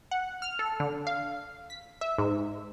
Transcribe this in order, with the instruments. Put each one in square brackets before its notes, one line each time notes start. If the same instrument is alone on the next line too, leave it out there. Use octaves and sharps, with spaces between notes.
[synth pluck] F#5
F6
A4
D3
F5
B6
E5
G#2